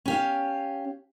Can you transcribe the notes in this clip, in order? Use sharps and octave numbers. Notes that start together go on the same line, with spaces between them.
C#4 G4 F5